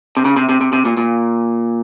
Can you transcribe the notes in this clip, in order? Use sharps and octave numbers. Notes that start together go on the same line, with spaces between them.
C3
C#3
C3
C3
C3
C3
A#2
A#2